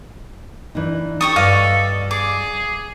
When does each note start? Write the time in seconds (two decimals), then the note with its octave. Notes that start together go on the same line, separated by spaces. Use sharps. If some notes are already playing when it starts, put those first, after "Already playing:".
0.75 E3 D4 D#4
1.21 G4 A4 C#6 D#6
1.36 G2 D5 D#5 F5
2.11 G#4 D6